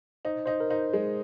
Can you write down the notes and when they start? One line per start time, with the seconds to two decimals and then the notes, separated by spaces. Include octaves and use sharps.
0.25 D#4 C5
0.46 D#4 C5
0.60 A#4
0.70 D#4 C5
0.93 G#3